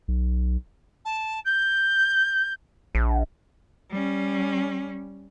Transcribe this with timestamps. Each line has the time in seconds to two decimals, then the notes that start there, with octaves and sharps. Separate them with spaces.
0.08 B1
1.05 A5
1.45 G6
2.95 A#1
3.91 G3 C#4